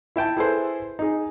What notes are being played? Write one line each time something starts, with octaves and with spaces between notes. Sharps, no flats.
E4 E5 G5 A5
E4 G#4 A4 B4 C5
D#4 G#4